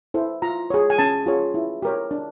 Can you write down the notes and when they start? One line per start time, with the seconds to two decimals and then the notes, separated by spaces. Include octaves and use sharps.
0.14 E4 A4 C5
0.42 F4 A#5
0.70 G#4 C#5
0.90 G#5
0.98 C#4 A5
1.26 F4 G#4 C#5
1.54 E4
1.82 G4 A#4 C#5
2.11 D4